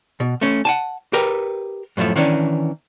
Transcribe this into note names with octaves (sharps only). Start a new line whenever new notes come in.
B2
A3 C#4
F#5 G#5 A5
G4 A#4 B4
F#2 A2 D#3 F3 A3
D#3 E3 C#4 D4